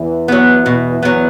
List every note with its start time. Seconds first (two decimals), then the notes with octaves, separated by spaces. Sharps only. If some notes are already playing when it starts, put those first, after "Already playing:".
Already playing: E2 E3
0.28 F#3 B3
0.66 B2
1.03 F#3 B3